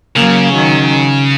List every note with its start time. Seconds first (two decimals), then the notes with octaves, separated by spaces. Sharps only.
0.16 C#3 F#3 A#3
0.54 D#3 F#3